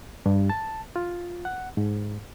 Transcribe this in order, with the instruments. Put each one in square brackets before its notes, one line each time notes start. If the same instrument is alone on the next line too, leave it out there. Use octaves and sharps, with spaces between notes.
[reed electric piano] G2
A5
F4
F#5
G#2